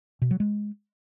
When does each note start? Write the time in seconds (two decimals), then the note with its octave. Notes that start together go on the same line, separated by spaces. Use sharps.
0.22 B2
0.31 F#3
0.40 G#3